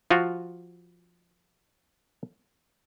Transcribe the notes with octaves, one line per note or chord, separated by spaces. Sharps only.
F3 F4 F#4